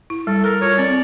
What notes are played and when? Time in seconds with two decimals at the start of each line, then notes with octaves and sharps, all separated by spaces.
0.10 E4
0.27 G3 A4
0.44 A4 A#4
0.61 F4 C#5
0.78 C4 D5